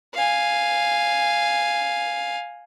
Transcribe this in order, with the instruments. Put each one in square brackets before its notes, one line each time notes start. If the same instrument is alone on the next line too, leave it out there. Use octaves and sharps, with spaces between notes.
[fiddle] F5 G#5